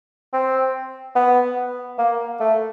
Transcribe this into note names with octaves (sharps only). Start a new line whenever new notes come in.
C4
B3
A#3
A3